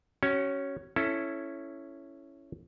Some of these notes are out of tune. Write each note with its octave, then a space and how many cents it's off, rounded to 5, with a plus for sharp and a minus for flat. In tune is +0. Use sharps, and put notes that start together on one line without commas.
C#4 +0 F#4 +35 C#5 +0
C#4 +0 E4 +5 A4 +0